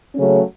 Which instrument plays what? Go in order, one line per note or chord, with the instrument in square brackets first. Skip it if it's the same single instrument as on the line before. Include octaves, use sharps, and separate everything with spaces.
[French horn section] C#3 F#3 A3 C#4